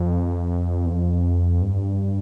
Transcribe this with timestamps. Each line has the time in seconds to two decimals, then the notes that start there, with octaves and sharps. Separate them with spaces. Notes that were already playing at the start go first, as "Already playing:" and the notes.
Already playing: F2
0.86 E2
0.91 F2
1.62 G2